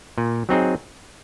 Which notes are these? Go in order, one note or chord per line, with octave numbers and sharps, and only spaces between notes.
A#2
F#3 C4 D#4 G#4